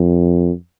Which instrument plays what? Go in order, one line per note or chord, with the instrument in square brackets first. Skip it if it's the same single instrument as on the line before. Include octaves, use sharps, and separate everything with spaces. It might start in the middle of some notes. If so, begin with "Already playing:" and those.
Already playing: [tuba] F2